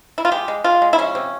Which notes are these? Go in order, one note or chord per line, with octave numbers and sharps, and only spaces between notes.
E4
F4
G#3 G4
G#3
G#3 F4
G#3
E4
F3 C#4
C3